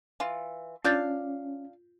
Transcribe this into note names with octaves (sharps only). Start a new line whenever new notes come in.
E3 F4
C#4 D4 F4 F5 G6 A6